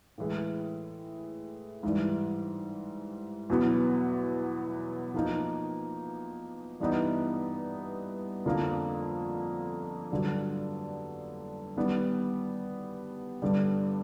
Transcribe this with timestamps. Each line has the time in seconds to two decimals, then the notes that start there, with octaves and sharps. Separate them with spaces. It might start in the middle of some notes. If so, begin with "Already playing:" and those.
0.18 A2 E3 G#3
1.83 G#2 E3 G3
3.50 E2 B2 F#3 B3
5.14 F3 A#3 D#4
6.80 G2 E3 G3 B3 D#4
8.46 F2 D3 F3 A#3
10.12 G2 D3 F#3
11.77 D#3 G3 B3
13.42 G2 D3 G3